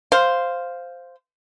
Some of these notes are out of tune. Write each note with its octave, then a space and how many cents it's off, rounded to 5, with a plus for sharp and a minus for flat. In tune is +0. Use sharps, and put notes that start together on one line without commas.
C5 +0 F5 +0